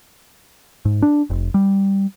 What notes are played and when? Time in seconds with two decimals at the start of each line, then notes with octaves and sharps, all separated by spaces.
0.85 G#2
1.02 D4
1.30 F1
1.54 G3